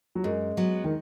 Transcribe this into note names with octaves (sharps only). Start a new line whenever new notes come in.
F#3
F#2 G#3
F#3 B3
D#3